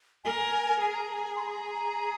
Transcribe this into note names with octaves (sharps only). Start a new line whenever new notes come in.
A#4 G#5
G#4 G#5
A#5
A#5
G#5
C6
A#5